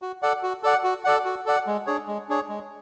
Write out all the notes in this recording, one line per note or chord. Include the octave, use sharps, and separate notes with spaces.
F#4
A4 D5 F#5
F#4
A4 D5 F#5
F#4
A4 D5 F#5
F#4
A4 D5 F#5
G#3
D4 G#4 C#5
G#3
D4 G#4 C#5
G#3